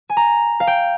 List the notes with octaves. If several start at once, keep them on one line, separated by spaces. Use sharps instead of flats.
G#5
A#5
F5
G5